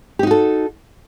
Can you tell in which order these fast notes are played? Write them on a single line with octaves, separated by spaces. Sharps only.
G4 D#4 F#4 A4